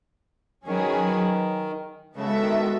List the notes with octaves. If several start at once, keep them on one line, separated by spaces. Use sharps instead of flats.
D#3 F#3 C#4 G#4 B4
C#3 G#3 B3 F#4 A4 E5
D#3
D#3